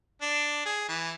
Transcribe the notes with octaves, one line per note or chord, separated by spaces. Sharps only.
D4
G#4
E3